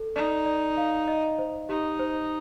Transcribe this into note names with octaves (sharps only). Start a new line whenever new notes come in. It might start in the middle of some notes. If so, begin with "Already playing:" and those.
Already playing: A4
D#4 D5
D5
F5
D#5
C5
D#4 G4
C5